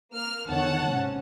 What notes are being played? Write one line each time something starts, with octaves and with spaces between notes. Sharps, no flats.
A#3 F6
E2 D3 D#3 C#5 F#5 A5
G#2 C3 C#4